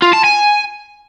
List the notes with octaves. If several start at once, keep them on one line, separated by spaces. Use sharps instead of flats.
F4
A5
G#5